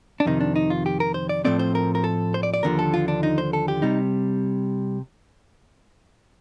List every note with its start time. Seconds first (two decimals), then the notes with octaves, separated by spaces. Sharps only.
0.20 D4
0.25 F2 C3 D#3 D#4
0.41 D4
0.56 D#4
0.70 F4
0.86 G4
1.00 A#4
1.14 C5
1.29 D5
1.45 A2 F3 A3 C4 D5
1.59 C5
1.75 A#4
1.95 A#4
2.04 A4
2.34 C5
2.43 D5
2.54 D5
2.63 D#2 D3 F3 A#4
2.79 A4
2.94 F4
3.08 D4
3.23 D#4
3.38 C5
3.53 A4
3.68 G4
3.82 C3 G3 D#4